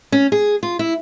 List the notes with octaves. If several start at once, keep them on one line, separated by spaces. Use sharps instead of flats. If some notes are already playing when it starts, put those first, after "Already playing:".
C#4
G#4
F4
E4